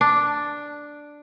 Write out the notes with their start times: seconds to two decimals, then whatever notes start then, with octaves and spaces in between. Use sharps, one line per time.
0.01 D4